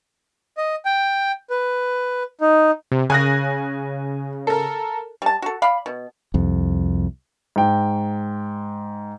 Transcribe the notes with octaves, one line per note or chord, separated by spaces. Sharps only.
D#5
G5
B4
D#4
C3
C#3 G#5 F#6 A#6
A4 A#4
G3 A5
F#4 A4
D5 F5 B5
B2
C2 F2
G#2 G5